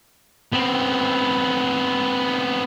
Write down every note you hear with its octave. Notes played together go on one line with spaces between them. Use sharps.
B3 C4